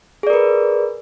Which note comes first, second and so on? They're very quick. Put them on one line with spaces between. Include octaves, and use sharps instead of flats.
G#4 D5 A#4 B4